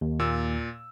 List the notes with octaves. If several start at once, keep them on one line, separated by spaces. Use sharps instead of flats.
D#2
A#2 E6